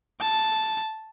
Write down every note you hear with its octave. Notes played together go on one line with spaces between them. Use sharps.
A5